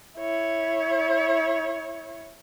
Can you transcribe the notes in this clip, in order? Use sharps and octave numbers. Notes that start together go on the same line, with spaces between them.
E4 C#5